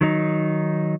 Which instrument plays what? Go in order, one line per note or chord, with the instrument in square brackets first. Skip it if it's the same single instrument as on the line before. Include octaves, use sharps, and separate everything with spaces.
[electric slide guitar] D#3 F#3 D#4